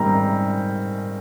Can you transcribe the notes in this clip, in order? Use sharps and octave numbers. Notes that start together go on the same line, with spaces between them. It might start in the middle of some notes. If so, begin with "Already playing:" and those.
Already playing: G#2 D#3 G3 C4 A#5